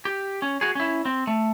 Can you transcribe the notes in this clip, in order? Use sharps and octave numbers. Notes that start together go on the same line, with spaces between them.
G4
C#4
F#4 G#4
C#4 E4
C4
A3